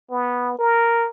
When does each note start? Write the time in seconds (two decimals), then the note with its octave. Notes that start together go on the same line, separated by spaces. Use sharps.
0.10 B3
0.59 A#4